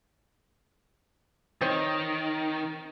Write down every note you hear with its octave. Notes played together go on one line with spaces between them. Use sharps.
D#3 C4 C#5